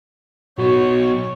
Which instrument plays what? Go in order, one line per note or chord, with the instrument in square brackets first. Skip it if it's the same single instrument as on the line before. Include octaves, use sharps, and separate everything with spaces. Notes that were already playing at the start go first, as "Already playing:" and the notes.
[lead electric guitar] B2 F#3 [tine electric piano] F#4 [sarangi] C#5